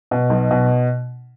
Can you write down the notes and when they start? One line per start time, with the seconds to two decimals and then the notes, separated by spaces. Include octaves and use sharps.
0.11 B2
0.30 B1
0.51 B2